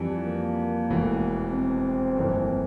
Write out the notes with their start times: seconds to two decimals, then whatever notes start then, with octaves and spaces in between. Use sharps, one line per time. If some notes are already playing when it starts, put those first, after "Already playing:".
Already playing: F2 E3 G3
0.26 A#3
0.90 E1 E2 E3 A3
1.52 C4
2.16 G1 F2 E3 A#3